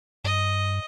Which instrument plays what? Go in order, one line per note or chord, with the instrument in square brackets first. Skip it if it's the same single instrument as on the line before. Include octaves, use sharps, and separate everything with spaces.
[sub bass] G2 [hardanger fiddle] D#5